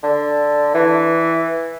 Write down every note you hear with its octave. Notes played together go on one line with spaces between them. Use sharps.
D3
E3